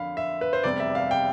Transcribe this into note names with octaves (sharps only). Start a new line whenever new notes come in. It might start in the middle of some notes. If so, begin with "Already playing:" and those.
Already playing: F2 D3 F5 B5
E5
B4
C5
F1 E2 C3 G3 D5
E5
F5
G5